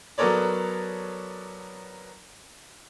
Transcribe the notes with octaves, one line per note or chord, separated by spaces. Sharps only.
F#3 B3 A4 A#4 C#5 D5